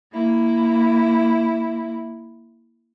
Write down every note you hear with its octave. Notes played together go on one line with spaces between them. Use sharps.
A#3 E4